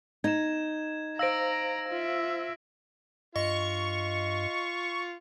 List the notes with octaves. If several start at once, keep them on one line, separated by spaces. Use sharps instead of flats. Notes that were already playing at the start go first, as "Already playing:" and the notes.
D#4 G#6 E7
C5 F5 A#5 E6 A#6 D7
F4 E5
G2 F4 D#5 C#6